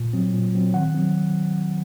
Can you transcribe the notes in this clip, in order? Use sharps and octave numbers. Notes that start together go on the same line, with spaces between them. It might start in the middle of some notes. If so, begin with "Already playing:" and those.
Already playing: A#2
F#3 C4
A#2
F#3 C4
D#3 F#5
F#3 C4